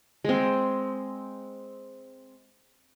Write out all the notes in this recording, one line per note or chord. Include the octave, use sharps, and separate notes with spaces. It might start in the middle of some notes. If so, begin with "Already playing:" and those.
G#3 C4